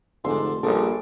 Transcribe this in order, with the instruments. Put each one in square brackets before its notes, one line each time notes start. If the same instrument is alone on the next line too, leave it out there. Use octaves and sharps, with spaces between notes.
[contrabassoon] F1 [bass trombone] G#2 [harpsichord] D3 D4 [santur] C6
[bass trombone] A#1 [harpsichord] G2 C#3 [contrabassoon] A#2 [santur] A4 D6